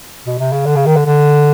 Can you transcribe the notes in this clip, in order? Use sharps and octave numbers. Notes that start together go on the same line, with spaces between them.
B2
C3
C#3
D3
C#3
D#3
D3
D3